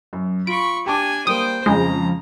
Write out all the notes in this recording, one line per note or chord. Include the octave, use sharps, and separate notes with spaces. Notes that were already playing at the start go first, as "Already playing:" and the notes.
F#2
F4 B5 C#6 D7
D4 G4 G#5 A5 D6
G3 A#3 C5 G5 D#6
F2 C#3 F3 G#3 A#5